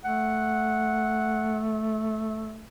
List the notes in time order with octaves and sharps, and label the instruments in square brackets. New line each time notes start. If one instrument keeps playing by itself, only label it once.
[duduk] A3 [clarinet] F#5